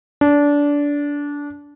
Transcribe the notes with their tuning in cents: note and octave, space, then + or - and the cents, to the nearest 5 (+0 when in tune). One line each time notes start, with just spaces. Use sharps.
D4 -20